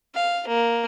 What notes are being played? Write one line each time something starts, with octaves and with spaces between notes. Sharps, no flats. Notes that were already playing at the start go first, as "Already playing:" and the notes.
F5
A#3